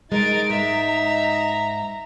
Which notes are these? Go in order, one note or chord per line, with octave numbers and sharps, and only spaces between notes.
G#3 D#4 A#4 A6 D7
G#2 E5 A#5